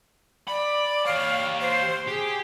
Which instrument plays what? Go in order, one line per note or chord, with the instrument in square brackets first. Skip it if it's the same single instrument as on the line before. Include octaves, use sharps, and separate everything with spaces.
[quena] D5 [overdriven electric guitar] B5
[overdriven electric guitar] G4 C#5 [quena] F5
[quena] C5
[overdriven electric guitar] G4 [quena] G#4